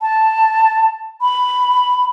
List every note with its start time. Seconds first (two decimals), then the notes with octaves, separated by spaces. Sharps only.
0.02 A5
1.22 B5